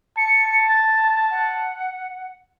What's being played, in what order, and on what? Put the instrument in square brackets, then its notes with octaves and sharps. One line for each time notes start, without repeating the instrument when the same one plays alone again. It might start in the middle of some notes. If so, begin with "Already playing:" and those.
[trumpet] A5 [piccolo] C#7
[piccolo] A6
F#5